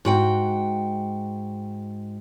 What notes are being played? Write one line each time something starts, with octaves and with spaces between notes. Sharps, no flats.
G#2 F#4 G5